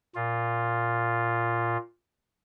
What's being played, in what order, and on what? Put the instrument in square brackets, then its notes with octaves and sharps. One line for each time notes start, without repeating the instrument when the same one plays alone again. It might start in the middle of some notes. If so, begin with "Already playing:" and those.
[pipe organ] A#2 F4